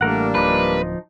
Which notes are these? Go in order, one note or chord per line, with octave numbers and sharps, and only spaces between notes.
A1 G3 A3 A#3 D4 A#4 F#5
D1 F3 D#4 B4 D6